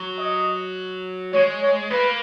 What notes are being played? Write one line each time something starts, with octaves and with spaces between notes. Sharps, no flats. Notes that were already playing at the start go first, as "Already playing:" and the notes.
Already playing: F#3
D#5
G#3 C#5
C#5
A#3 B4